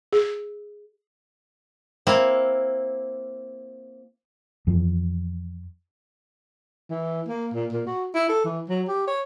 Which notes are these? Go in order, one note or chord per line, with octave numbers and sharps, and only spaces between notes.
G#4
A#3 C4 E4
F2 E3 F3
E3
A#3
A#2
A#2
F#4
E4
A4
E3
F#3
G4
C#5